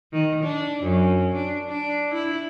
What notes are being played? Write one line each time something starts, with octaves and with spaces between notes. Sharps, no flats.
D#3
D4
F#2
D4
D4
E4